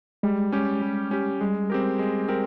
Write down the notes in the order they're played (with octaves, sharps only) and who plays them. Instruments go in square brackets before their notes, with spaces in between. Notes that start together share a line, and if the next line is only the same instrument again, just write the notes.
[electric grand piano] G3 [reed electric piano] G#3
[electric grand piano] C#4 G4
G3
C#4 G4
[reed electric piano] G3 [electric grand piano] G#3
[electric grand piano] C4 G4 A#4
G#3
C4 G4 A#4